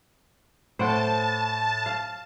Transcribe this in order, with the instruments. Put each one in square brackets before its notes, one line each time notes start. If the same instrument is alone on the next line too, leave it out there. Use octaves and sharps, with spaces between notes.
[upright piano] A2 [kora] C5 F#5 G5 [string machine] A5
[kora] F5